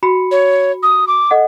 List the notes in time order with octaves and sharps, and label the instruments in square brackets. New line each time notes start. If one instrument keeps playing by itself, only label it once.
[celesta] F#4 B5 C#7
[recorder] C#5
D#6
D6
[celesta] A4 D#5 F#5